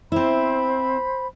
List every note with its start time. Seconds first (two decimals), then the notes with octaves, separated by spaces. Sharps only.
0.12 C4 E4 C5 B5